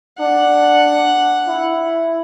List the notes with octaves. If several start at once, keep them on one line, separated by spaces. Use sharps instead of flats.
D4 F#5
E4